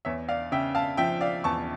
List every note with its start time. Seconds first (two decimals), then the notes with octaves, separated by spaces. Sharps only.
0.05 E2 C#5 E5
0.29 D5 F5
0.52 C#3 E5 G5
0.75 F5 A5
0.97 F3 E5 G5
1.21 D5 F5
1.44 E2 A5 C#6